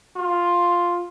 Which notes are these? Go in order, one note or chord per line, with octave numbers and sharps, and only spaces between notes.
F4